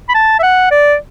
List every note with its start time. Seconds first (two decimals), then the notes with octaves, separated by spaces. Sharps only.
0.09 B5
0.14 A5
0.39 E5
0.43 F#5
0.71 D5